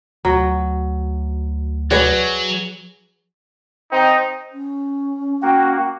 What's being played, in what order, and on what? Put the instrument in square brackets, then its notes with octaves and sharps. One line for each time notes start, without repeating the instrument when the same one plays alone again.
[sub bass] D2 [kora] F#3
[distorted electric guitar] F#3 [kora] F#4 C#5 [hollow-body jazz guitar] G#4 B4 D5
[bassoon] C4 [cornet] D#4
[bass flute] C#4
[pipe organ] A#3 F#4 [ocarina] G5